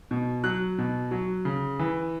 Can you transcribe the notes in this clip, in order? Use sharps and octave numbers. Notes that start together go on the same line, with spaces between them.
B2
F#3 F#6
B2
F#3
C#3
E3